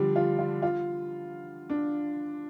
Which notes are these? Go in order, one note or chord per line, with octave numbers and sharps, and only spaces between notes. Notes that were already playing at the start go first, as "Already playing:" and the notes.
Already playing: D3 F3 G3 D4
F4
F4
F4
D4